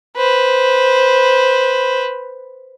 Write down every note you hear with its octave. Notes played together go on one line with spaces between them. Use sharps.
B4 C5